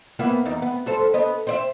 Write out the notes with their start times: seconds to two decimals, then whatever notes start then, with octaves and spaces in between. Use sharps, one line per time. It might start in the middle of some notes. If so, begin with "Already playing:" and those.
0.19 A#3 B3 E4
0.45 E2 D#4
0.62 B3
0.86 G2 A4 C5
1.14 B3 D#5
1.47 C5 D5 E5